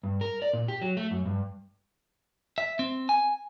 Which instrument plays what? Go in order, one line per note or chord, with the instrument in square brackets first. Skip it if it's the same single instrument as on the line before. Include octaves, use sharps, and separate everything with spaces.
[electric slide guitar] G2
A#4
D5
A#2
G4
F#3
A3
F#2
G2
[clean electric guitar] E5
C4
G#5